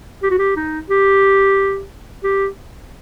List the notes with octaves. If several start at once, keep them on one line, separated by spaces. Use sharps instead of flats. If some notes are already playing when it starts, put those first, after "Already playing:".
G4
F#4
G4
D#4
G4
G4